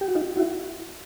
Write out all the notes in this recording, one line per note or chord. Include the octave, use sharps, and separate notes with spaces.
G4
F#4
D#4 F4
E4 F#4